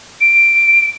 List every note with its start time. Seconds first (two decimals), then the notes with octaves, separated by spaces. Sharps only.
0.21 D7